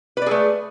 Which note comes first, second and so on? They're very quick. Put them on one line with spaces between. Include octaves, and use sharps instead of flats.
B4 D5 G#4 A3